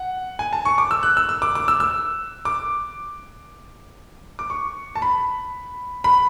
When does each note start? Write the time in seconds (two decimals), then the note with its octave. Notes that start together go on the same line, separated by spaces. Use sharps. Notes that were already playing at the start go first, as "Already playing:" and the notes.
Already playing: F#5
0.39 G#5
0.53 A5
0.65 C#6
0.78 D6
0.91 E6
1.03 F#6
1.17 E6
1.29 E6
1.42 D6
1.55 D6
1.68 E6
1.80 E6
2.45 D6
4.39 D6
4.50 C#6
4.95 A5
5.02 B5
6.04 B5